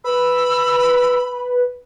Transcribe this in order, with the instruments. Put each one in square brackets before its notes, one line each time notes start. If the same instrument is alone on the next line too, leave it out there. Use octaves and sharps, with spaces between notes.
[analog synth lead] B4 [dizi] B5 [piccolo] E6